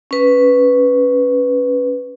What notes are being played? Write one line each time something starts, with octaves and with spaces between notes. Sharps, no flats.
C#4 B4